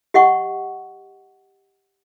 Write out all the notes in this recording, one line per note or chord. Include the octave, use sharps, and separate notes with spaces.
G4 D#5 F#5 C#6